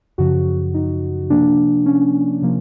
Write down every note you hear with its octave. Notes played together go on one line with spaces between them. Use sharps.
F#2 C#3 F3 F#4
D#4
C3 F3 A#3 D4
C#4
C3 F3 A#3